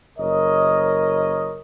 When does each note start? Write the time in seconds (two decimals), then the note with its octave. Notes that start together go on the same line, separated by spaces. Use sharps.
0.18 F#1 A#4 C#5 D#5